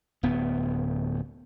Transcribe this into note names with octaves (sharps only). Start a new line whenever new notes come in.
D1 B3